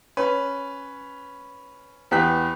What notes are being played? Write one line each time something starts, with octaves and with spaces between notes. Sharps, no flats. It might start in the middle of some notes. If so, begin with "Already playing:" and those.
C#4 B4
E2 B3 G4 F#6 B6